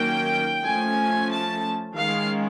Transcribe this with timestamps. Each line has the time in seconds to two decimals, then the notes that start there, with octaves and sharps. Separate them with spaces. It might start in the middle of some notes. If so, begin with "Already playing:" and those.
Already playing: D#3 F#3 A#3 C#4 G5
0.64 F3 A3 C#4 G#5
1.30 A5
1.96 D#3 G#3 C#4 F5